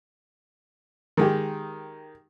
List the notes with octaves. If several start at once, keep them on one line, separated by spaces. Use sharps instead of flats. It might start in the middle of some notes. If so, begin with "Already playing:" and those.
D#3 G#3 G4